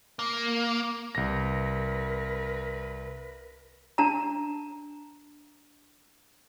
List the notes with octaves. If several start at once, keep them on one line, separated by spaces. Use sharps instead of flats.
A#3
C2 A#4 B4 A#6
D4 A5 A#5